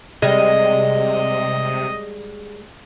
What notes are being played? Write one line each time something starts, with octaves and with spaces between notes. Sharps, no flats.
C3 G3 G#3 D#5